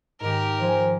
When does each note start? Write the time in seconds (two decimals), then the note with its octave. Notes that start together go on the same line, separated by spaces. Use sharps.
0.20 G#2 D#3 G4 A#4
0.61 F3 C5 G#5